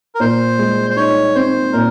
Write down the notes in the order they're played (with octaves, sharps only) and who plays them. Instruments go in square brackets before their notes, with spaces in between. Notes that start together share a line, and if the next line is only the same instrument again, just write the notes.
[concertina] A#4
[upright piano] A#2 [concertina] C5
[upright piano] G#3
[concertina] C5
[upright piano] D#4 [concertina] C#5
[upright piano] C4 [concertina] C5
[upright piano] A#2 [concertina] A#4